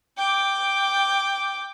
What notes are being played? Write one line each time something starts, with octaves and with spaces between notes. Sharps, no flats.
G5 D6